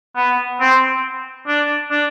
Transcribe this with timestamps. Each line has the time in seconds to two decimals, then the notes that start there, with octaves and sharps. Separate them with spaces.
0.16 B3
0.61 C4
1.47 D4
1.91 D4